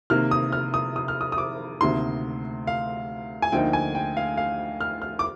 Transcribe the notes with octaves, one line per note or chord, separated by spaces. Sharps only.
C3 D#3 A#3 F6
D#6
F6
D#6
D#6
F6
D#6
D#6
D6
D2 C3 D#3 A#3 C6
F5
G#5
D2 D3 F3 A#3 D#4 G5
G#5
G5
F5
F5
F6
F6
D6